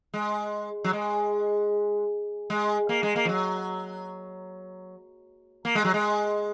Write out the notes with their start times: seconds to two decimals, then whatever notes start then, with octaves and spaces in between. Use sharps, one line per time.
0.14 G#3
0.84 F#3
0.93 G#3
2.50 G#3
2.89 A#3
3.03 G#3
3.16 A#3
3.25 F3
3.29 F#3
5.65 A#3
5.75 G#3
5.85 F#3
5.94 G#3